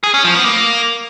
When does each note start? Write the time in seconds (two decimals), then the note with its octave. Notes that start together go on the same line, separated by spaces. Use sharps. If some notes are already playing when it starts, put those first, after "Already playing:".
0.03 G#4
0.14 C#4
0.24 F3
0.35 B3
0.45 A#3